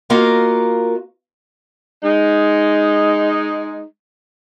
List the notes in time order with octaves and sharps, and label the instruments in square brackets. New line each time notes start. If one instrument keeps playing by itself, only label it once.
[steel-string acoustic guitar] A#3 F4 F#4 A#4 D#5 F5
[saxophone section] G#3 D#4